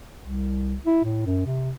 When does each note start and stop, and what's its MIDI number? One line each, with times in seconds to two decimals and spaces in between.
0.21 0.75 36
0.86 1.01 64
1.04 1.24 45
1.26 1.43 42
1.46 1.71 48